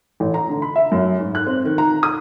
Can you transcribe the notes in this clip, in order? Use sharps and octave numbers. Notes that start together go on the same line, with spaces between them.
A1
A#5
D3
B5
E5
F#2
G#2
F#6
C4
D#3
A#5
D#6